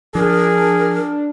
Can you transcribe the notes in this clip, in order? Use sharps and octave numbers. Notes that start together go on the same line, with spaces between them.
F3 D4 G#4 A#4